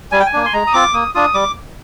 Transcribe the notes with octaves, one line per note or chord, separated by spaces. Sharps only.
G3 G#5
G5
G#5
A#3 D4
C6
G#3 A#5
D#6
C4 F4 D6
A#3 D#6
D4 F4 D#6
G3 D6